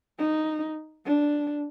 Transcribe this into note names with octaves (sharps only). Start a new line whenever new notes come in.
D#4
D4